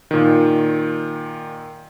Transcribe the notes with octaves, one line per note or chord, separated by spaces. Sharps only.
A#2 D#3